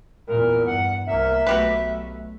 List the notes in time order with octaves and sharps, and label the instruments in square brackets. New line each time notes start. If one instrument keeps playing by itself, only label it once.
[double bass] E2 A#2 [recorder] A#4
[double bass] G2 [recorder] F#5
[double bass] C2 A#3 [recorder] E5
[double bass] B1 A3 [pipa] F#4 G4 B4